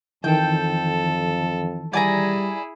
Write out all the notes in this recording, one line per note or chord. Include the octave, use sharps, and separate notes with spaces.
F2 D#3 E3 A4 G5
G3 E4 G#4 D5 G#5 A#5